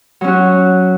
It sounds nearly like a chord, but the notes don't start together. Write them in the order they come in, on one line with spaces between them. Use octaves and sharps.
F#3 C#4 F#4